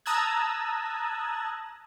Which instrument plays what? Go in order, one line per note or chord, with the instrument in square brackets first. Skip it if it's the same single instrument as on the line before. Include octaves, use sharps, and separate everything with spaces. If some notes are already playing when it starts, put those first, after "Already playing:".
[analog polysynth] A5 A#5 D#6 E6 F#6 G#6